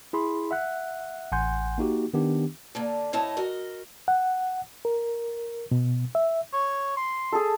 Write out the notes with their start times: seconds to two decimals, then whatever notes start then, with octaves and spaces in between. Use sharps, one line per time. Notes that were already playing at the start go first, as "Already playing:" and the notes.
0.13 E4 G#4 B5 C6
0.51 E5 F#5 F#6
1.32 A1 F#5 G#5 C6 G6
1.78 A#3 D#4 F#4 G4
2.14 D#3 B3 D4 G4
2.75 D3 A#3 D4
3.13 A2 E4 C#5 D#5 A5
3.37 F#4 A#4 D#5
4.08 F#5
4.85 A#4
5.71 B2
6.15 E5
6.53 C#5
6.96 C6
7.32 G#4 A4